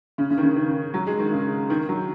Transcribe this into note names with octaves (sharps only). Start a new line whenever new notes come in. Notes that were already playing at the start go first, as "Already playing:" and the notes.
C#3
C#3
D#3
C#3
D#3
F#3
G#3
D#3
C#3
D#3
F#3